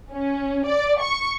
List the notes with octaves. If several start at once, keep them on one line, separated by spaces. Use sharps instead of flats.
C#4
D5
C#6